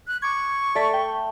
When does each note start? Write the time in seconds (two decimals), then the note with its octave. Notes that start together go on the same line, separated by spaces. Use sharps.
0.07 F#6
0.22 C#6 D6 G#6
0.75 A3 D5 A6 B6
0.93 G5